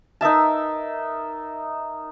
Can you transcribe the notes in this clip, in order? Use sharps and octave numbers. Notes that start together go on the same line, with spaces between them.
D#4 A#4 E5 A5